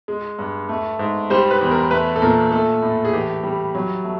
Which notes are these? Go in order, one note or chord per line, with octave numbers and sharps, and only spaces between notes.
G#3
G2
A3
G#2
G3 C5
B4
E2
A#4
A3 B4
A4
A#2 A#4
A3 A4
A2
G#4
E3 G4
G3
F#3
A3